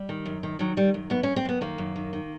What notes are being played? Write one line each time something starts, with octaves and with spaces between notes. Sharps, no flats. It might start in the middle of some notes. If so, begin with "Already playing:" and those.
Already playing: G3
D#3
F#2
D#3
D#3 F#3
D#3 G3
F#2
F#2 B3
C#4
F#2
C4
F#2 B3
D#3 A#3
F#2
D#3
D#3